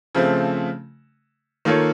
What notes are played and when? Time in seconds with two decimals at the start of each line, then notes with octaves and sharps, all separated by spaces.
0.15 C#3 F3 A3 C4
1.65 D#3 A#3 F4 A4 C#5